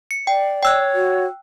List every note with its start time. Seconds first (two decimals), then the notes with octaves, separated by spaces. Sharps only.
0.11 C#7
0.27 D5 G5
0.63 C#5 G5 E6 F#6
0.94 F#4